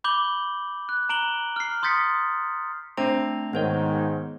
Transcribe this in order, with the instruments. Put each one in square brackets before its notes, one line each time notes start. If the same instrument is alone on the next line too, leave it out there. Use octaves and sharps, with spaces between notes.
[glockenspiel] B5 D6 G6 F#7 G7
F#6
A#5 D7 F#7 G7
F6 C7
C6 D#6 G6 A6 B6 C#7
[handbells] A3 D4 A#5 [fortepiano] C4
[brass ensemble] G#2 D#3 [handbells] B3 C5 C#5